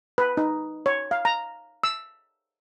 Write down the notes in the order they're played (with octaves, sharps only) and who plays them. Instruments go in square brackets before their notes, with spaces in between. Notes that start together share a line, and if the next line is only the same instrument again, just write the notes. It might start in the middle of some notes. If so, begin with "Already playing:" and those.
[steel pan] B4
D#4
C#5
F5
A#5
E6